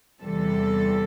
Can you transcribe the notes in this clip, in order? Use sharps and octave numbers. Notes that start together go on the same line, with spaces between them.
E2 C3 E3 G3 A4